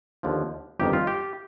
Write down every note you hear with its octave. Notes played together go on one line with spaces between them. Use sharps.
D#2 D3 F3
G1 F2 D#3 G4
F4
G4